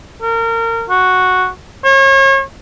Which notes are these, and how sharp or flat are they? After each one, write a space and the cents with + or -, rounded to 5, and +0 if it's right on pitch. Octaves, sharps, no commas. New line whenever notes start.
A#4 -30
F#4 -5
C#5 -35